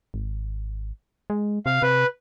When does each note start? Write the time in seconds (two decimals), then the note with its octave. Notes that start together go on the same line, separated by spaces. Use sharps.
0.14 G#1
1.30 G#3
1.66 C3 F5
1.82 C3 B4